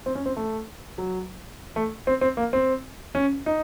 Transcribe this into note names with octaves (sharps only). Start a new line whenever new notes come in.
C4
C#4
C4
A3
F#3
A3
C4
C4
A#3
C4
C#4
D#4